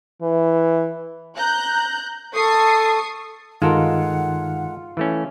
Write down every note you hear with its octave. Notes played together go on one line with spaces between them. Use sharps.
E3
A#5 F#6 G6
A4 C#6 D#6 C7
G2 D#3 G#3 D#4 F4 A4 A#4 F#5
E3 A3 C#4